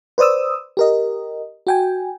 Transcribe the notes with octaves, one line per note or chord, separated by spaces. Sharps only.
B4 C5 D5 D#6 E6
G4 A#4 D#5
F#4 G5 G#5